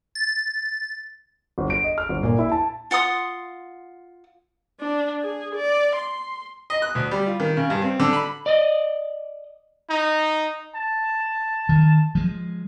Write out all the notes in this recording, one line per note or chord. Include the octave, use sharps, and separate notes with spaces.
A6
G1
D7
D#5
F6
G1
A#2
E4
A5
F4 F#5 C6 D#6
D4
G#4
D5
C6
D#5
F#6
D2
G3
F4
D#3
C#3
G2
C4
D3
B5
D5 D#5
D#4
A5
D#3
F3 G#3